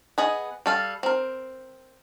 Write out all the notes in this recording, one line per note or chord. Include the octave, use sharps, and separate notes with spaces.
B3 G#4 D#5
G3 A4 F5
C4 A#4